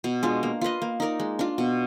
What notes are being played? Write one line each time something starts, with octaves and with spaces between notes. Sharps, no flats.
B2
G#3 D4 F4
A#3
F4 B4 D#5
A#3
D#4 A#4 D5
G#3
D4 F4
B2